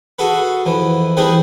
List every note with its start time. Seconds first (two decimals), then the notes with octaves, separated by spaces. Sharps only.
0.19 F#4 G#4 A4 B4
0.66 F2 E3
1.17 E3 G3 A3 C4 G#4 B4